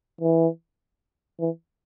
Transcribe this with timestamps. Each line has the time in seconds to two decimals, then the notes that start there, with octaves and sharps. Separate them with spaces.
0.21 E3
1.40 E3